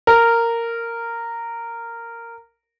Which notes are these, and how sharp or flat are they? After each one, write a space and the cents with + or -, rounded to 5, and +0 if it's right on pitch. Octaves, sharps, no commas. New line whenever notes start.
A#4 -10